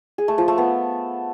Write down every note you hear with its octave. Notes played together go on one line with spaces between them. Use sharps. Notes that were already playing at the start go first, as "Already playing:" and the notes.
G#4
A3
F3
A3
B3